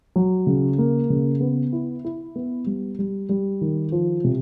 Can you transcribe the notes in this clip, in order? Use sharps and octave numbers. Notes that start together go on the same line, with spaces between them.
F#3
C#3
A#3
C#3
B3
E4
E4
B3
G3
G3
G3
D#3
F3
C3